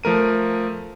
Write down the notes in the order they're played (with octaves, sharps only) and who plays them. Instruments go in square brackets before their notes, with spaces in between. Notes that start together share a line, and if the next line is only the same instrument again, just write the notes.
[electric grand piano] F3 A3 A#4 D#7